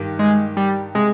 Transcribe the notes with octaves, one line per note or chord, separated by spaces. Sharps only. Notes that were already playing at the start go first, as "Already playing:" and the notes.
Already playing: G2 D#3 G4
G#3
G3
C3 G#3